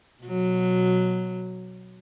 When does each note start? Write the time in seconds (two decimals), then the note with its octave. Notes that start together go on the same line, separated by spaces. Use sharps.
0.23 B2 F#3